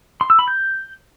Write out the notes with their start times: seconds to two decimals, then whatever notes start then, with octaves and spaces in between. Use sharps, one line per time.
0.21 C6
0.30 E6
0.39 B5
0.48 G6